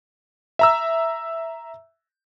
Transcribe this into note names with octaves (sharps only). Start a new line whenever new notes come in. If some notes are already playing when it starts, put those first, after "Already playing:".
E5 A#5 E6